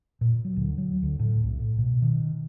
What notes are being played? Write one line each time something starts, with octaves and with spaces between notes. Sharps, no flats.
A#2
F#3
D2
F#3
D2
A2
C2
A2
B2
D#3